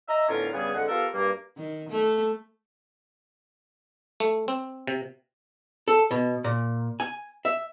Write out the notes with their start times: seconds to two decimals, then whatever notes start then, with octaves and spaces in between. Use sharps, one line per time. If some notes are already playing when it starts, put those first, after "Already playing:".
0.09 D#5 E5 A#5
0.29 A2 D3 B3 C#4 F4 A#4
0.54 G2 C#3 G3 B3 G#4 G#5
0.74 F2 D3 G#3 F#5
0.88 B3 F4 G4 A4 A#4
1.14 G2 A#3
1.58 D#3
1.90 A3
4.20 A3
4.48 C4
4.87 C3
5.88 A4
6.11 B2
6.44 A#2
7.00 G#5
7.45 E5